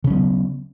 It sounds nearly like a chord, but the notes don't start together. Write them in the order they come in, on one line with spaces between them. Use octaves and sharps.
C#3 C#4 F#3 B3